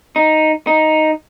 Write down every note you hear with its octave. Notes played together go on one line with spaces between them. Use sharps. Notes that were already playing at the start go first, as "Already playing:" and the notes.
D#4
D#4